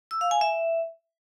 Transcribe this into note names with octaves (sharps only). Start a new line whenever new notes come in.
E6
F5
G#5
E5